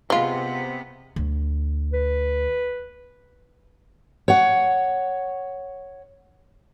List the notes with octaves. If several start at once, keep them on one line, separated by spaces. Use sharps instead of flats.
C3 G#3 B3 F4
D2
B4
C#5 F#5